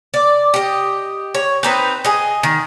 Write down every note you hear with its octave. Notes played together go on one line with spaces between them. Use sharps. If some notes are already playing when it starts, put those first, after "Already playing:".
D5
G4 D#5
C#5
C4 D#4 B4
G#4 D#5
D#3